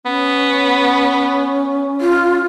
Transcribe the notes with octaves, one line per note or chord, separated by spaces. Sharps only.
B3 C#4
F4